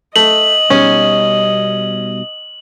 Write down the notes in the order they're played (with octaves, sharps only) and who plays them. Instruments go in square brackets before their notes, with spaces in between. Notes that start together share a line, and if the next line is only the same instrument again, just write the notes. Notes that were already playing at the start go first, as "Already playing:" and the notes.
[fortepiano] A3 [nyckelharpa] D#5 [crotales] F#7
[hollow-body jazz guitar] B2 G3 D#4 [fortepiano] C#4